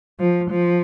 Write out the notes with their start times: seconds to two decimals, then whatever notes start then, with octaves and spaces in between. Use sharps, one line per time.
0.20 F3
0.50 F3